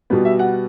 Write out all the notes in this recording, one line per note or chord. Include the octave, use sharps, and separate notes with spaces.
B2 G3 B3
E5
F#5